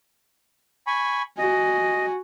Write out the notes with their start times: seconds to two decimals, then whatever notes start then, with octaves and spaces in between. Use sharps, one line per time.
0.87 G#5 B5 C#6
1.38 F#4 D#5 G#5